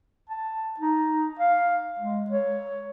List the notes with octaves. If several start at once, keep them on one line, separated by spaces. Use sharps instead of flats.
A5
D#4
F5
G#3
C#5